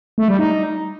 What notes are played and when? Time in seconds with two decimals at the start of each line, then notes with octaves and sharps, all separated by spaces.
0.18 A3
0.28 G3
0.39 D#4